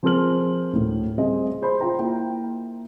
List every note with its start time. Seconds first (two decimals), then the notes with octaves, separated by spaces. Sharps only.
0.03 F3 C4 G#4 A#4 F6 F#7
0.73 D2 A2
1.18 G3 C4 G#4 D#5
1.62 G#4 C5 B5
1.81 F4 C5 G5 A#5
1.99 A#3 E4 G5